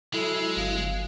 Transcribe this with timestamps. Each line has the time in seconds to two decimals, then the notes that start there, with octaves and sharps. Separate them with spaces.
0.14 F#3 G#3 E4 A4
0.57 G1 F5